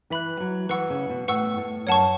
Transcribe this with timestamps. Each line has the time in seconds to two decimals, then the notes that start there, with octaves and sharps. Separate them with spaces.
0.10 E3 E5 B5 F#6
0.40 F#3
0.69 E3 B4 F#5 C#6 E6
0.90 C#3
1.09 B2
1.28 A2 B4 F#5 C#6 E6
1.58 A2
1.87 F#2 C#5 F#5 A5 C#6